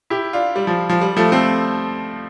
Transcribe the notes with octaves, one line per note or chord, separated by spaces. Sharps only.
E4 G4
D4 F4
G3
F3
F3
G3
F3 A3
A3 C4